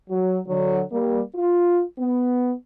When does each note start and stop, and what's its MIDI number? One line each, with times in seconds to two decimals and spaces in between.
0.10 0.39 54
0.47 0.82 50
0.47 0.82 54
0.92 1.21 55
0.92 1.21 58
1.35 1.83 65
1.99 2.53 59